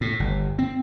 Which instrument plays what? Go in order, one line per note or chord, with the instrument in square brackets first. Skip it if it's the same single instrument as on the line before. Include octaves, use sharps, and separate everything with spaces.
[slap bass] A2
G1
C4